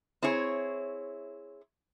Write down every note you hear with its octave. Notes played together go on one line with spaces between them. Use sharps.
C4 E4 G#4 C#5